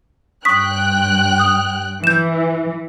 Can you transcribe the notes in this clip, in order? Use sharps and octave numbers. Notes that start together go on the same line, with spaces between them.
G2 G5 C#6 D#6 F#6 B6
D#6
E3 G6 E7